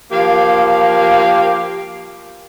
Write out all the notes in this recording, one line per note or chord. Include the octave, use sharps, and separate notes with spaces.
F3 A#3 G4 F5